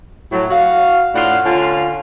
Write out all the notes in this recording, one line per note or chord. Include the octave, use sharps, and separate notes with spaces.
A2 F#3
F#4 F5
A2 D4 F4 F#5
D3 C#4 F4